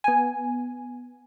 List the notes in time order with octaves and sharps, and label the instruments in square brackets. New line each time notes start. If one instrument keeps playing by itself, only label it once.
[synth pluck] B3 G#5